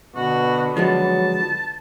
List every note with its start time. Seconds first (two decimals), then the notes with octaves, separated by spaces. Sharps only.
0.16 B2 D3 B3 F#4
0.77 F3 F#3 G#3 F#4 A5